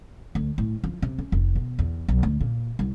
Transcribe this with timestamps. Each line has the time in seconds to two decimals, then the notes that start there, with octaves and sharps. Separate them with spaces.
0.35 D2
0.58 A2
0.84 F3
1.02 C3
1.18 C#4
1.32 F1
1.55 B2
1.79 E2
2.08 B1
2.23 D2
2.41 A#2
2.79 C2